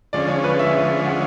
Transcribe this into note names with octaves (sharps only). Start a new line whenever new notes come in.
D3 F3 G#3 C#4 D5
C#5
B4
E5
E5
F#5